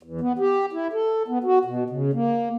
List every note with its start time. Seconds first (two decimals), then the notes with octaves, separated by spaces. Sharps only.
0.03 E2
0.21 B3
0.39 G4
0.73 E4
0.93 A4
1.28 B3
1.44 F#4
1.65 B2
1.90 C#3
2.13 A#3